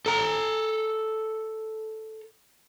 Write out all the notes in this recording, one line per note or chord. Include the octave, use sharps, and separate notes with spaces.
A4 A#5